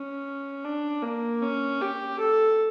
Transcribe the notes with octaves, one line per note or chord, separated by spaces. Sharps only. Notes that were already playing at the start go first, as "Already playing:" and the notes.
Already playing: C#4
D4
A#3
C#4
G4
A4